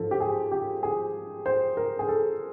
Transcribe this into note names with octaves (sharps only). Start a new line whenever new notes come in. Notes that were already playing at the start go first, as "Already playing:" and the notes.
Already playing: G#2 F3 A4
G4
G#4
G4
G#4
C5
A#4
G#4
A4